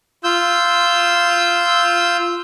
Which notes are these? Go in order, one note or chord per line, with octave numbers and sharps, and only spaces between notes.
F4 E6 G6